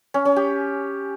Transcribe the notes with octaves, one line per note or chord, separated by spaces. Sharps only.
C#4
C#4
G4